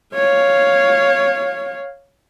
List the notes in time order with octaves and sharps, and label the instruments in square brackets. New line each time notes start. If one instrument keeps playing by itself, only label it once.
[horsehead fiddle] C#5 F5